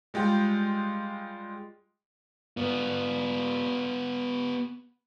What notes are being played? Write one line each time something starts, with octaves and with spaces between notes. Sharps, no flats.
G3 G#3 F4 G5
B3 F4